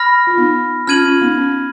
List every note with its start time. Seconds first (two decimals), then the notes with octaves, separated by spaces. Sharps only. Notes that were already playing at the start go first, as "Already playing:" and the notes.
Already playing: B5 F6 A#6
0.27 F4
0.37 B3 D#4
0.87 C#4 F4 F6 G#6 D#7 F#7
1.04 C#4 F4
1.21 B3 D#4
1.38 C#4